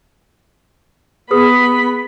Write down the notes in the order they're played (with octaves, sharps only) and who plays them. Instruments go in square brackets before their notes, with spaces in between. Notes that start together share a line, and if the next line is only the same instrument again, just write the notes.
[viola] B3 B5 [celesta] G#4 B4 D#6